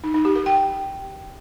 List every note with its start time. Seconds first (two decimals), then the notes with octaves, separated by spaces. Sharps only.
0.04 D#4
0.14 D#4
0.25 G4
0.36 A#4
0.46 G5